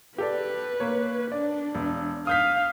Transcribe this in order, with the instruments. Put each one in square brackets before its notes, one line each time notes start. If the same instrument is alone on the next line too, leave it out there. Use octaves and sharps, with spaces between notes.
[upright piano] G4 A4 D5 [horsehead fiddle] B4
[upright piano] A#3 C#5
[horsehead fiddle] D4 [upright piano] D5
[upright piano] E1
[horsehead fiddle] F5 [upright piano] D#6 G6 B6